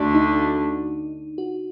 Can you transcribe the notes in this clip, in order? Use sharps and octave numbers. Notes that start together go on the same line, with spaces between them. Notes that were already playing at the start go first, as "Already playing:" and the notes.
Already playing: D2 D3 A3 D4 F#4
D#4
F#4